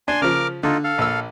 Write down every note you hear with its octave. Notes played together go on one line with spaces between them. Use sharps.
D4 G#5 C6
C#3 F3 A#4 D6 F6
D3 D#4 F4 A4
A4 F5
A#1 E6